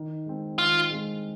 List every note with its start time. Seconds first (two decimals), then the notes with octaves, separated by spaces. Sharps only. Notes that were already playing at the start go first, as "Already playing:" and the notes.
Already playing: D#3
0.26 G#3 C4
0.58 D#3 F4
0.90 G#3 C4